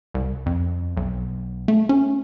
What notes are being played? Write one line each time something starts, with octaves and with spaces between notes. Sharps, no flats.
C2
F2
B1
A3
C#4